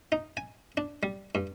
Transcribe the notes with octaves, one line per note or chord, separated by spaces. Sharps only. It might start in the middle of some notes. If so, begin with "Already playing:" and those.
D#4
G#5
D4
G3
G2